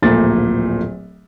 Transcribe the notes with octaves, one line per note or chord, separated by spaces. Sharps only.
D1 A#1 A#2 A3 A6